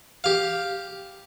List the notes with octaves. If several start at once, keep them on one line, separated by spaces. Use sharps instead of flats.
G4 F5